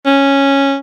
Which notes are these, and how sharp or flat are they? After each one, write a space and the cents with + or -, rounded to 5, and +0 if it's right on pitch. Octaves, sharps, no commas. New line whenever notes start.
C#4 -5